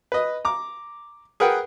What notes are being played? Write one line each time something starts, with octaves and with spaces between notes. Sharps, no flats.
B4 D#5
A#5 D6
G#4 A#4 B4 F#5 G5